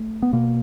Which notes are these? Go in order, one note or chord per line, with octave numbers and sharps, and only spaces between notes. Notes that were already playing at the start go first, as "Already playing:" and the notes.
Already playing: A3
B3
B2 A#3